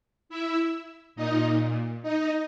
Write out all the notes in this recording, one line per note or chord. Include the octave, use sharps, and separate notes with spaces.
E4 E5
A#2 D#4 D#5
D#4 D#5